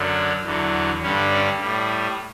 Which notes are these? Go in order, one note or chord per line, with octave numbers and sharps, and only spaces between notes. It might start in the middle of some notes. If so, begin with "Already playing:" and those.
Already playing: F#2 D3 F#3
E2 D3 F#3
G2 D3 G3 C#4
C#4
A2 G3